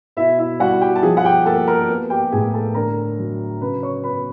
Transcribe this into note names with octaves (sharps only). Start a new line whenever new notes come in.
B2 E4 E5
E4 E5
G3 F#4 F#5
G4 G5
A5
F3 G#4 G#5
F#5
G4 G5
A#3 A4 A5
A#4 A#5
B3
G4 G5
A2 G#4 G#5
A4 A5
D3 A#4 A#5
F#3
C#3 B4 B5
C#5 C#6
B3 B4 B5